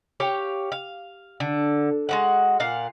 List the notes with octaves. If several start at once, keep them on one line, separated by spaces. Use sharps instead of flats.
G4 C#5 F5
F5
D3
G#3 F#4 F#5
A#2 F5 F#5